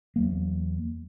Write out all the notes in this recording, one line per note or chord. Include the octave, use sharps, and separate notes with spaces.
E2 F#3 A#3